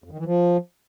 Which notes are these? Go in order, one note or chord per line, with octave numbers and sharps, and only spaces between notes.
F2
D#3
E3
F3